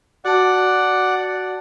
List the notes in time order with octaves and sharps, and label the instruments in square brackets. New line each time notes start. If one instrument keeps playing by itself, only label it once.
[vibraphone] F#4 A5 [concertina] D5 F#5